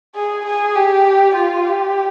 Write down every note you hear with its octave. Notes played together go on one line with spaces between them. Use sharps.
G#4
G#4
G4
F4
G4